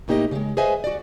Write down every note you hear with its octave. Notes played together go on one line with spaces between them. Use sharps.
A2 A#3 D#4 G4 D5 D#5
C#3 G#3
G#4 B4 C5 D#5 E5 G#5
F#4 D5